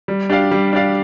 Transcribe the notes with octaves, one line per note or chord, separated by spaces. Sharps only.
G3
D4 G4 D5 F5
G3
D4 G4 D5 F5